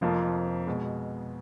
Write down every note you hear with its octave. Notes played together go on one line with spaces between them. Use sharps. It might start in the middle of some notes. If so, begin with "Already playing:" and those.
F1 F2 F3 A#3 F4
B2 G#3